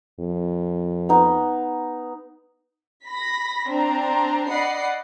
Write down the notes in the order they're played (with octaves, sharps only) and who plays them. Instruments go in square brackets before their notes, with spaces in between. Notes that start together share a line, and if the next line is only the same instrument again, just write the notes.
[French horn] F2
[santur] B3 D#4
[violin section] B5 A#6 B6
C4 D4 A#5
D5 D#5 F#5 B5 C7